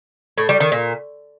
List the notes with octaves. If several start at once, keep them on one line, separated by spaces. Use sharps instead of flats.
A2
G3
D#3
A#2